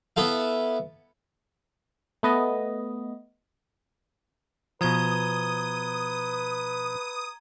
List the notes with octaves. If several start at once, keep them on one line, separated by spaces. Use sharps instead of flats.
B3 E4 A4 F5
A3 B3 D#5
B2 F3 B4 A#5 D#6 G#6 G7